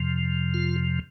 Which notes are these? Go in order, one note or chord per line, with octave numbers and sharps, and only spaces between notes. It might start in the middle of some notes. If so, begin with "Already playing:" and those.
Already playing: F2 C3 F3
F4